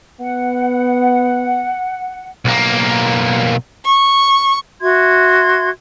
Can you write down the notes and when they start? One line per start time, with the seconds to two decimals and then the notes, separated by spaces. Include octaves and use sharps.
0.20 B3 F#5
2.45 B1 A#3
3.85 C#6
4.81 F#4 E5 C6 G#6